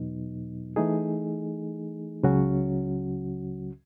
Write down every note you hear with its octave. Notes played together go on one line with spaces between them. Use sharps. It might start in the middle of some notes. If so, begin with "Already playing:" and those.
Already playing: E2 B2 F#3 B3 D#4
E3 A3 D#4 G#4
C#2 C#3 F#3 C#4 F#4